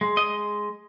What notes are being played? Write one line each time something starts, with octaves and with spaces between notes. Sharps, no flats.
G#3
D#5